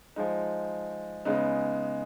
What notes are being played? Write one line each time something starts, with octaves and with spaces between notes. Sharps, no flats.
F3 G#3 D#4
C#3 G#3 B3 D#4